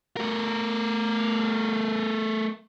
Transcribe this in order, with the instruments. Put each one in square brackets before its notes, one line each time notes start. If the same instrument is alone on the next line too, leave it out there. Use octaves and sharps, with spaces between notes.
[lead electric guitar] A3 A#4